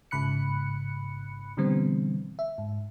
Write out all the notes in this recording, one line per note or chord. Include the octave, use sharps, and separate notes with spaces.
A1 G#2 C#3 B5 F#6 C#7
B2 D3 E3 G3 B3 C4
E5
G#2